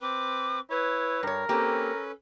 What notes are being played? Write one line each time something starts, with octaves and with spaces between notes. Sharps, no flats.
C4 B4 D6
E4 B4 C#5
G2 A#4 C#5
A#3 C4 C#4 G4 A4 B4